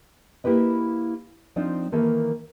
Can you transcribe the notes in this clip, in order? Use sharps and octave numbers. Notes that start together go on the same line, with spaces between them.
A#3 E4 G4 B4 D#5
F3 C4 D4 D#4 F4
D#3 E3 A#3 A4